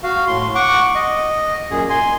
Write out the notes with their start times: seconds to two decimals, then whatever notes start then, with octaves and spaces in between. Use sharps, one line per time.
0.03 F#4 F5
0.27 A2 C6
0.55 F#5 C#6 D6
0.95 D#5
1.70 F#2 A#2 G#4
1.90 G#5 C6